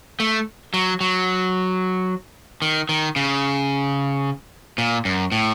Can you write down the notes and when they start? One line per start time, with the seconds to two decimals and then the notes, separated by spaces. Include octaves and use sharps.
0.20 A3
0.74 F#3
1.01 F#3
2.62 D#3
2.89 D#3
3.16 C#3
4.78 A#2
5.05 F#2
5.32 A2